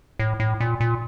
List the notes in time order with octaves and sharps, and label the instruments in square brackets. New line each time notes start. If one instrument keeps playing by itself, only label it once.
[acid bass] A2
A2
A#2
A#2